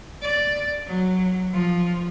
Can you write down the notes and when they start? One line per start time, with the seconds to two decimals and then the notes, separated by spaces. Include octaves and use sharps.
0.22 D5
0.86 F#3
1.53 F3